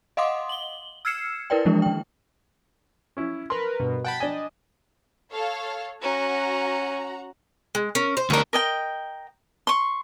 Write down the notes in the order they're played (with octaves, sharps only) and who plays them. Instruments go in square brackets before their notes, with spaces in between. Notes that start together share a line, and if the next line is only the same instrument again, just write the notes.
[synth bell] D#5 F5 F#5 C6 D6 D#6
F#7 G7
E6 F6 G#6 C7 C#7 E7
E4 A#4 B4 D5 G5
E3 F3 G#3 A#3 D4 E4
D#3 G5
[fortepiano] C#4 E4
[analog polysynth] A#4 B4 [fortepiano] C6
[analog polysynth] G2 B2
[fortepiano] F#5 [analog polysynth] G5 A5 B5
[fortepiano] D4 G#5 [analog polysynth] D#5
[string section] A4 C#5 F5
[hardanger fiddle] C#4 [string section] F#4 F#5 A#5
[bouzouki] G#3
C#4 A#4
C5
[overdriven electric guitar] D2 A#4 [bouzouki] C#4 D4
[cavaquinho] A#4 D#5 G5
C6 C#6